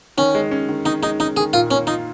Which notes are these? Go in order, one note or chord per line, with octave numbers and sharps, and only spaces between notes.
D#3 C#4
G#3
C#4
D#3
D#3 D#4
G#3 D#4
C#4 D#4
D#3 G#4
A#2 F4
A#3 C#4
D#4 F4